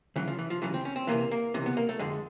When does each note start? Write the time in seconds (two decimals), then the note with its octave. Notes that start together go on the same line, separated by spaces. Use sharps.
0.16 D2 C#3 E3 F#3
0.28 F3
0.39 E3
0.50 F3
0.62 D2 C#3 E3 F#3
0.74 C4
0.85 C#4
0.96 C4
1.07 C#2 C3 E3 A#3
1.31 A#3
1.54 C#2 C3 E3
1.66 B3
1.77 A#3
1.89 A3
1.99 F2 D3 G#3